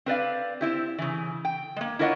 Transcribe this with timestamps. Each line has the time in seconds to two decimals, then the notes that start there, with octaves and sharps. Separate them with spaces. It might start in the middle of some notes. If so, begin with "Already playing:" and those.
0.06 C4 B4 D5 F5
0.61 C4 E4 G4
0.98 C#3 E3
1.45 G5
1.76 G#3 A#3
1.99 E4 F4 A#4 C#5 D#5 F#5